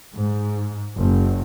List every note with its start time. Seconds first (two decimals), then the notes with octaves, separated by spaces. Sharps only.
0.15 G#2
0.98 F#1